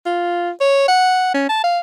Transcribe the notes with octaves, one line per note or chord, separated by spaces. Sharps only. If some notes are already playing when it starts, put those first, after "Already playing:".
F4
C#5
F#5
C#4
A5
F5